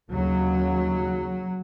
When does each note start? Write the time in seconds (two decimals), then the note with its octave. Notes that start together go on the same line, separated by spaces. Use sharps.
0.11 D#2 C#3 F#3